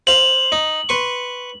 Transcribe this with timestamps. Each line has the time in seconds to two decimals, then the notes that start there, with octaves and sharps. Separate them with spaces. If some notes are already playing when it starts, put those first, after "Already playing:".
0.07 C5 F5 F#7
0.52 D#4
0.89 B4 C6 C#6